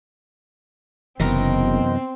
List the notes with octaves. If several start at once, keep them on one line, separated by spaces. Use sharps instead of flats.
F#1 F#2 C3 E3 B3 C4 A#4 D#5